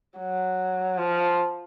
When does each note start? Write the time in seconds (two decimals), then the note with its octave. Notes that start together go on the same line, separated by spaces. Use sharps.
0.18 F#3
0.98 F3